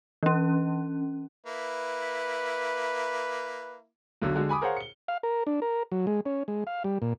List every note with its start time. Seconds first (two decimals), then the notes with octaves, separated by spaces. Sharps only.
0.23 E3 C#4
1.46 A#3 E4 B4
4.22 B1 D3 F#3
4.36 D3 G#3 F#4
4.49 G#5 B5 D6 D#6
4.61 G#4 A#4 C5 C#5 F5 F#5
4.77 C#7 G7
5.08 F5
5.23 A#4
5.47 D4
5.62 A#4
5.92 F#3
6.07 G#3
6.26 C#4
6.48 G#3
6.67 F5
6.84 G3
7.02 A#2